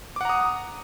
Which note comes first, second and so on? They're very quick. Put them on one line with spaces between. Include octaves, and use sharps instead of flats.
D6 F#5 A#5 D#6